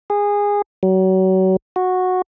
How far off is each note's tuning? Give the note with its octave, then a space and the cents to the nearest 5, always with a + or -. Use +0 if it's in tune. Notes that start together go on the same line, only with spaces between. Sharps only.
G#4 -20
F#3 +30
F#4 -10